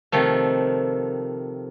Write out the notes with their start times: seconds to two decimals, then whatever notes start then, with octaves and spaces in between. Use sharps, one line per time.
0.12 C3 D#3 F3 A3